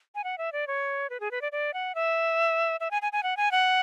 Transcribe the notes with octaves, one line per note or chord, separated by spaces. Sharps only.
G#5
F#5
E5
D5
C#5
B4
G#4
B4
D5
D5
F#5
E5
E5
G#5
G#5
G#5
F#5
G#5
F#5